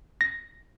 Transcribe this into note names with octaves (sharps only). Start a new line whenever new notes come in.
A#6